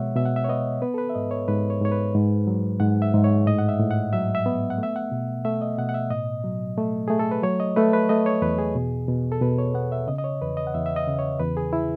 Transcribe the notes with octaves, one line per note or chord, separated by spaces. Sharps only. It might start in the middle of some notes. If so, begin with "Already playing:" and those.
Already playing: B2 G#3 C#5 E5 F#5
B2 E5
F#5
E5
C#5
B3 D#5
B3 B4
A4
B4
E5
G#2 D#5
C#5
G#2 B4
C#5
G#2 C#5
B4
G#2
F#3
G#2 F#5
E5
G#2
C#5
A2 D#5
F#5
E5
A2
F#5
F#3 E5
E5
B3
F#5
A3 E5
F#5
B2
A3 E5
D#5
B2 F#5
F#5
E5
A2 D#5
F#3
A3
A3 G#4
A4
B4
F#3 C#5
D#5
A3 B4
B4
A3 D#5
C#5
E2 B4
G#4
B2
B2
A4
B2 B4
C#5
B3 F#5
E5
C#3 D#5
D#5
C#5
E2 B4
D#5
F#5
E2 E5
E5
D#5
C#3
C#5
E2 B4
G#4
E4